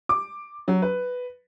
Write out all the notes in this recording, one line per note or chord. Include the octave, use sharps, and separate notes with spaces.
D6
F#3
B4